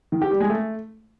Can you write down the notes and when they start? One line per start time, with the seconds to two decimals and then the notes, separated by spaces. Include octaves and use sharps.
0.12 D#3
0.22 G4
0.31 G3
0.40 G#3
0.50 A3